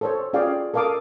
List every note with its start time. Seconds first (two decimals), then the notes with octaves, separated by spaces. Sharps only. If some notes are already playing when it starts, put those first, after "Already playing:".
0.01 A4 C5 C#5
0.33 C#4 F4 G#4 D5 F5 G5
0.74 A4 A#4 F5 A5 D6 D#6